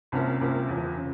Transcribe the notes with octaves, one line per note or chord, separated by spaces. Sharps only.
C2 C3 F3 A#3 C#4
C2 C3 F3 A#3 C#4
E2 C#3 F3
C#3 F3